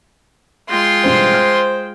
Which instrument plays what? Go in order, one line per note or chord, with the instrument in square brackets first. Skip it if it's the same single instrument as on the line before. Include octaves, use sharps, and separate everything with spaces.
[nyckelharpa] G#3 G5 [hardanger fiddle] F4 C6
[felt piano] A1 G2 B2 [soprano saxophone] C5
[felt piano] F6